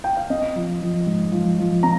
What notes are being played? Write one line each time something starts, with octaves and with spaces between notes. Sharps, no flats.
G5
F5
C4 D#5
F3
F3
G#2
F3
F3
C4 A#5